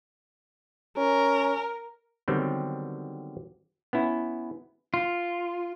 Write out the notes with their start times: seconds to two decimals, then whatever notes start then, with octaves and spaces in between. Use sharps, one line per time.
0.97 C#4 A#4
2.28 D3 D#3 F#3 G3 B3 C4
3.93 B3 C#4 E4
4.94 F4